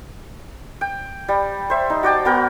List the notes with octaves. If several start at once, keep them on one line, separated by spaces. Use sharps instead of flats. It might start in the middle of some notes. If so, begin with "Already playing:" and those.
G5
G3
C5 E5
D#4
F#4 D5 G5 A5
B3 F#4 A#4 G5